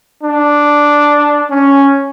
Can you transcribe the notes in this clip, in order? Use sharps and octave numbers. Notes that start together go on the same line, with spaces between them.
D4
C#4